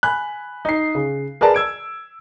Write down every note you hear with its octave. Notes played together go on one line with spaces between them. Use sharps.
G#5 B5 F#6
D#4 C7
C#3
G#4 A#4 B4 D5 A5
E6 G#6 D7